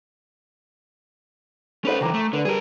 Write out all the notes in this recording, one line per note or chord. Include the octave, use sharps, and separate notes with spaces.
C#4 A4 B4 C5
C#3 E3 G5 A#5 D6
A3
D3 B4 D5
G3 G#4 A#4